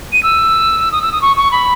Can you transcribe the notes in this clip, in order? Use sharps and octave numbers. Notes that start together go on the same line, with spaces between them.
D#7
E6
D#6
E6
D#6
C#6
C#6
B5